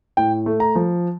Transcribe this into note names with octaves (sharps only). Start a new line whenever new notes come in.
A2 G5
A3
A#5
F3